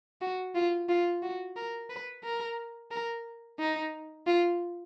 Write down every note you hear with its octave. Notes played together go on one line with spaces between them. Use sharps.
F#4
F4
F4
F#4
A#4
B4
A#4
A#4
D#4
F4